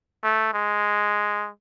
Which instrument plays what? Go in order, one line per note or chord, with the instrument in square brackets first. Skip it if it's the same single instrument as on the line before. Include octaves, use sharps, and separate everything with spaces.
[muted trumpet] A3
G#3